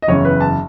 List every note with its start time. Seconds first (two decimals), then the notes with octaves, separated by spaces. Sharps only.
0.02 D#5
0.08 F#1 E2 C#3 C#5
0.25 B4
0.40 A5